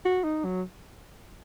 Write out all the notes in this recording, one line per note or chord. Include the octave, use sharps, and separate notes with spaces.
F#4
D#4
F#3